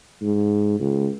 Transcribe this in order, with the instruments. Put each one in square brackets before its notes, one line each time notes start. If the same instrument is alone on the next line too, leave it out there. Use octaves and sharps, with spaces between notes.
[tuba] G#2
C#2